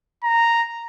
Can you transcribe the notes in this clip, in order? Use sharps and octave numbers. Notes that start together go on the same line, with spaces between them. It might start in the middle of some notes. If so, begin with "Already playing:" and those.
A#5